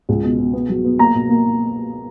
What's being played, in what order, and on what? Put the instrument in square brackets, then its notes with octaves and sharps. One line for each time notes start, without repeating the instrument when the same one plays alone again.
[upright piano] C#2
B2
B2
B3
F#3
B3
A#3 A#5
B2
A#3